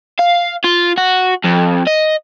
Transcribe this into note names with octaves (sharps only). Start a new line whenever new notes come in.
F5
F4
F#4
F2
D#5